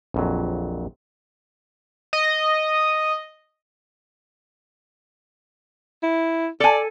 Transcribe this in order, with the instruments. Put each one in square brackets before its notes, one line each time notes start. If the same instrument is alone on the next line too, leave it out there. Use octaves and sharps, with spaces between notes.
[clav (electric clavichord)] A#1 F2 F#3
[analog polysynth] D#5
[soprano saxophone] E4
[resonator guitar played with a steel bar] A4 G#5 [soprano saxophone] D5